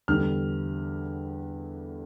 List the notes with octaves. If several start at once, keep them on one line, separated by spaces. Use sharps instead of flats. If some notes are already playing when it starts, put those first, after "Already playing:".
E2 D3 G3 F6